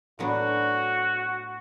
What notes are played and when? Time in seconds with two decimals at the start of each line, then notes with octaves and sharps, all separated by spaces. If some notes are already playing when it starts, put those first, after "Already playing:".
0.19 A2 F#3 B3 D4 F#4